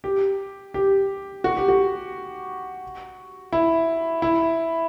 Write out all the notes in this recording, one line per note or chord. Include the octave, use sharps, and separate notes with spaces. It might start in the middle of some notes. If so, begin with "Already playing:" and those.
G4
G4
F#4
G4
F#4
E4
E4